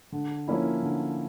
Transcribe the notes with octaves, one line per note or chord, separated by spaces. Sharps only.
D3
F3 A#3 C#4 E4
D3